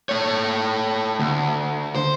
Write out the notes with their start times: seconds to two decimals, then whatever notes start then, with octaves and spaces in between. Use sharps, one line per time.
0.09 A3 C#5
1.20 D2
1.95 C5